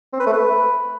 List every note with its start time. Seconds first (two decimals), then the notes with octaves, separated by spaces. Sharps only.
0.13 C4
0.20 B4
0.27 A3
0.33 B4